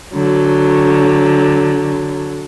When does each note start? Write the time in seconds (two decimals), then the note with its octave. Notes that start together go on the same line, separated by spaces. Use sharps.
0.14 D3 F#3